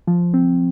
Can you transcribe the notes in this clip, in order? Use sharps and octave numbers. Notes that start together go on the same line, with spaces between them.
F3
C4